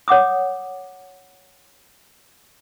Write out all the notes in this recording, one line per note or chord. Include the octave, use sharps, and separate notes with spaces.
C#5 F#5 D6 D#6